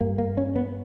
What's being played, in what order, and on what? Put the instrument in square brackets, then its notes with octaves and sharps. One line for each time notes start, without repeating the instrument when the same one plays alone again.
[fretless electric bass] G2 A#3
A#3
C#4
B3